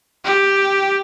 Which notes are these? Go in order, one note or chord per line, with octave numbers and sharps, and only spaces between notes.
G4